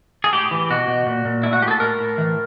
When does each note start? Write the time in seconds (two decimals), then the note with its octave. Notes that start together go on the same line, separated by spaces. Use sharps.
0.24 G#4
0.33 A2 G4
0.51 E3
0.70 B2 F#4
0.88 B2
1.06 A#2
1.25 A#2
1.43 A2 E4
1.53 F#4
1.62 A2 G4
1.68 G#4
1.71 A4
1.80 A2 A#4
2.00 A2
2.18 E3